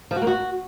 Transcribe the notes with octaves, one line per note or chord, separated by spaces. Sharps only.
F3
F#4
A#3
F#4